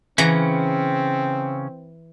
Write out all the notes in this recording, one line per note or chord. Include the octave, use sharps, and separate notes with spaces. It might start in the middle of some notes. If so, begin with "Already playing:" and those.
C#3 E3 C4 C#4 F#5 A#5